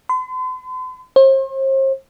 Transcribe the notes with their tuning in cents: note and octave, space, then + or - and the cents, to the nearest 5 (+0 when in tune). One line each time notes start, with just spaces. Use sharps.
C6 -45
C5 +40